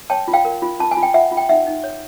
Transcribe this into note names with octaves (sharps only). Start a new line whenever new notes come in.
C#5 G5 A5
F4
F5 G5
A#4
F4
F4 A5
G#5
F4
G5
F4 E5 F#5
F4
G5
D#4 E5 F#5
D#4
C#5